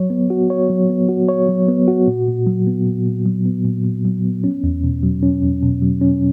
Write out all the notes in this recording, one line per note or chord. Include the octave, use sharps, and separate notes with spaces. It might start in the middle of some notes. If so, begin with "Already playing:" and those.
Already playing: F#3 C#5
B3
F#4
C#5
F#3
B3
F#4
C#5
F#3
B3
F#4
A#2
A#2
F#3
B3
A#2
A#2
F#3
B3
A#2
A#2
F#3
B3
C#4
E2
B2
F#3
C#4
E2
B2
F#3
C#4